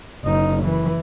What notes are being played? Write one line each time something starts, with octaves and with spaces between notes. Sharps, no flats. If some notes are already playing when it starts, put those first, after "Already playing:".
F#1 D#4
E3